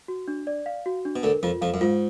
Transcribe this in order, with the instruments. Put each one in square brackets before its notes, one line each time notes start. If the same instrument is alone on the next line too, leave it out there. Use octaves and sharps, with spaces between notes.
[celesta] F#4
D4
D5
F5
F#4
D4
[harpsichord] B2
[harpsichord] D2 D3 [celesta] A#4
[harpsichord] F2 F3 [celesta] F4
[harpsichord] F2 F3 [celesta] F5
[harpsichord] F#2
[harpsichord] G#2 [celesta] F4